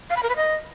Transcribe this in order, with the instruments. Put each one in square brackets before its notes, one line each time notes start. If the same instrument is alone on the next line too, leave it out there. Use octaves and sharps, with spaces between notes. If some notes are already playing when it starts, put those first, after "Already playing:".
[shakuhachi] F5
B5
A#4
B4
D#5